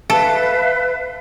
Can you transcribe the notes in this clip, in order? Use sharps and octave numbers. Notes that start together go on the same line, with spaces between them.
A4 B4 E5 F5